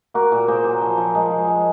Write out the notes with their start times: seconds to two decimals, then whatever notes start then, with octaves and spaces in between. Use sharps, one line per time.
0.14 A#3 F#4 A#4
0.32 A#2
0.48 A#3 G#4 C5
0.64 F#3
0.82 F3
0.98 F3
1.15 G#3
1.31 F3
1.47 G#3